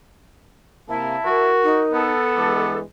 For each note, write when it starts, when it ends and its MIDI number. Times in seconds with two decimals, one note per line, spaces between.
0.89 1.15 48
0.89 1.15 58
0.89 1.53 64
0.89 1.40 81
1.26 1.82 66
1.26 2.04 70
1.64 2.11 63
1.92 2.80 59
1.92 2.77 69
2.37 2.82 43
2.37 2.82 52
2.37 2.82 56
2.37 2.74 86